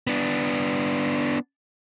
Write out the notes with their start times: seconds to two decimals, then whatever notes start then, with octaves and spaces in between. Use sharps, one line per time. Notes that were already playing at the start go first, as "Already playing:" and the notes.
0.07 B3 D4